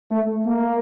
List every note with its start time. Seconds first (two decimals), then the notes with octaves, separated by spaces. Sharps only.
0.11 A3
0.45 A#3